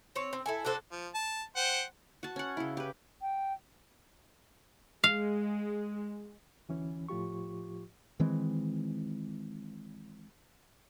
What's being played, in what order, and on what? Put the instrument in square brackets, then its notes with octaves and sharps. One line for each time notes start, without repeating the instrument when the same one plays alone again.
[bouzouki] C4 C#5
C4
E4 A4 G#5
D4 F#4 A4 C5
[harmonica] F3
A5
C5 F#5 G5
[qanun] F#4 A5
C#4 F#5
C#3 E4
G4 B4
[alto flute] G5
[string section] G#3 [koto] F5
[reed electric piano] D2 E3 C#4
A2 F3 F4 G4 C#6
[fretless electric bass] D#3 E3 G#3 C4